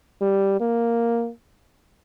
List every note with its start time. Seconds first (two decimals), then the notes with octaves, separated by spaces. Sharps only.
0.21 G3
0.60 A#3